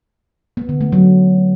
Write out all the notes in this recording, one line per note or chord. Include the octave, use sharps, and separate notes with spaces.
B3
D3
A3
F#3